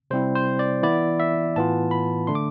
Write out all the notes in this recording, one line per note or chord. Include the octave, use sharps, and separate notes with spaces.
C3 G3 C4 E4 C5
C5
D5
E3 B3 E4 D5
E5
A2 E3 B3 F4 A5
B5
D3 A3 D4 C6
D6